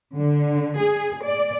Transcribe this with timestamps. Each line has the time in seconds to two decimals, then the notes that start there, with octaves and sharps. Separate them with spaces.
0.16 D3
0.80 G#4
1.25 D5